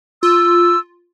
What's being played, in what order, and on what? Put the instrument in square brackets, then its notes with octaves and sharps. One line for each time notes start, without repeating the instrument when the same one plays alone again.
[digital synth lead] F4 [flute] E6